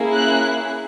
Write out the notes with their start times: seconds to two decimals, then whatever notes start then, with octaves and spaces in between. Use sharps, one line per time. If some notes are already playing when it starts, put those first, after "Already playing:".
Already playing: A#3 C#4 E4 G#4
0.14 F#6